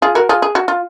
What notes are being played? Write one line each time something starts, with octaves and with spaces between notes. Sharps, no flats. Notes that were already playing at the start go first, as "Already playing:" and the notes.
F4 G#4
F#4 A#4
F4 G#4
G#4
F#4
F4